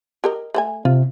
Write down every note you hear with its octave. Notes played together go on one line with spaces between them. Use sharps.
G4 A#4 D#5
A3 C5 G#5
C3 F4